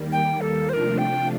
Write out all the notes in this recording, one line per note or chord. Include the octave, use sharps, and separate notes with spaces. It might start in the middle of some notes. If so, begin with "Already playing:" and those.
Already playing: D#2 D#3 G3 A#3
G5
A4
C3 F3 A3 D4 F4 A#4 C5
G5